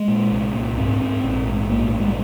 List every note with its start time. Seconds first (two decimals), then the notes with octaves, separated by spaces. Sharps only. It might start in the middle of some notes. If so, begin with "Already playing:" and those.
Already playing: G#3
0.08 A#2
0.32 C2
0.55 A#2
0.77 G#2 C4
1.02 G#2
1.24 A#1
1.47 G#2
1.70 A#1 A#3
1.94 A#2
2.00 G#3
2.08 G3